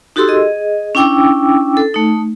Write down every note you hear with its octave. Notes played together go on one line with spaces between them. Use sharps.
D#4 F#4 G4 A4 C6 E6
G#4 D#5
C#4 D4 E4 G5 D6 E6
A4
A3 D#4